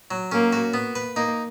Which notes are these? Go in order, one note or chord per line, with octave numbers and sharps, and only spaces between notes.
F#3
A#3 C#4
F#4
B3
B4
A#3 D#4